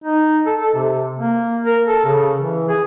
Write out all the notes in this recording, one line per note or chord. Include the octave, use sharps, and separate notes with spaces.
D#4
A4
A4
C3
A#3
A#4
A4
C#3
E3
G#4